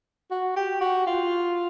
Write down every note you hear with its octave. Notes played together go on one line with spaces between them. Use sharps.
F#4
G4
F#4
F4